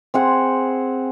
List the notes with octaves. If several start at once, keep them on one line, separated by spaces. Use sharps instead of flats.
C4 G#4 F#5